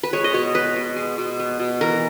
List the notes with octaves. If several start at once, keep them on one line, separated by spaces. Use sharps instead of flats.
B4
G#3 C#5
D#5
B2 C#5
B3 B4
B2
G#3
B2
B3
B2
E3 A#4